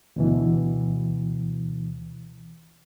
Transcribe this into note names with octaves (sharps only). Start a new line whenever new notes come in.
D2 B2 E3